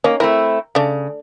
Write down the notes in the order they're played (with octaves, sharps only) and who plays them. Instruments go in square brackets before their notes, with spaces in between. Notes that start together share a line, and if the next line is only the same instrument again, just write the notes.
[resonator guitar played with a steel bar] A#3 [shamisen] C#4 D#4
[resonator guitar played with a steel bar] A3 C4 E4 [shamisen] A#4
[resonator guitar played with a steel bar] C#3 [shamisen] A3 D4